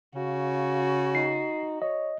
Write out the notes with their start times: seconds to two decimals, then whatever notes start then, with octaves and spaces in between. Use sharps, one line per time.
0.15 C#3 F#4 F5
1.15 D#4 C7
1.82 C#5 D#5